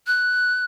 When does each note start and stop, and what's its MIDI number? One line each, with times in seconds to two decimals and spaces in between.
0.07 0.65 90